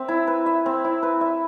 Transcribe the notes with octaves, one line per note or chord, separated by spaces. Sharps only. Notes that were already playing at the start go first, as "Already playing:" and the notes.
Already playing: C4 E5
E4
B4
E5
C4
E4
B4
E5